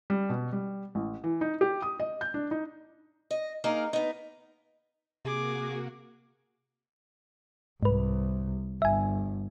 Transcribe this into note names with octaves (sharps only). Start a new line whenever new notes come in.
G3
B2
G3
A1
E3
D#4
G4
D#6
D#5
G6
D4
D#4
D#5
A#3 D#4 G#4 A#4
B3 D#4
C3 A#3 F#4 G#4 D6
C2 G#2 B4
G1 E5 G#5